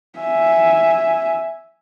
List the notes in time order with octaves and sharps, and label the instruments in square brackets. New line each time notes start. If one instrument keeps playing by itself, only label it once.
[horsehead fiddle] E5 G#5